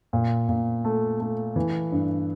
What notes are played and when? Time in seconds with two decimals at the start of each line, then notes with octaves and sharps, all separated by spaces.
0.13 A#2
0.49 A#2
0.85 A3
1.20 A3
1.56 E3
1.92 G2